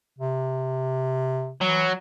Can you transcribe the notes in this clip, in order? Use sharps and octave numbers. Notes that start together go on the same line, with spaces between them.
C3
E3 F#3